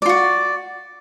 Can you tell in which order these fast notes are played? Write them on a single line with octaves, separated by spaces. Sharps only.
D5 F4 F#4